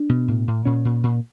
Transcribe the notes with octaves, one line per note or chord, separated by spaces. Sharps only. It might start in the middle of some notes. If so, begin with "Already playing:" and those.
Already playing: D4
B2
A2
A2
A#2 C#4
A#2
A#2